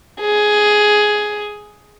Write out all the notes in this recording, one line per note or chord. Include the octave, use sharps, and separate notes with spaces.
G#4